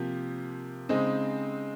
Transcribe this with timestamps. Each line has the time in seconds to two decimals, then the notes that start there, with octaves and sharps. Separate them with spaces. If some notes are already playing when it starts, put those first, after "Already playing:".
Already playing: C3 F3 A#3 G4
0.89 C#3 G#3 C4 D#4